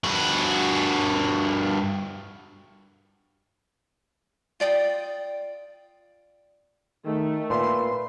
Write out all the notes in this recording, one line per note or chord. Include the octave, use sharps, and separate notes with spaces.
G2 F#4
F4 D5 G5 D#6
D#3 A3
A#2 B4 E5 C6